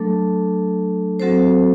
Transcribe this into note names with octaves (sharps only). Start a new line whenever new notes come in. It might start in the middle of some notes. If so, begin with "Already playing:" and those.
Already playing: F#3 A3 D4 A4
F#3 C4 F#4 A4 C5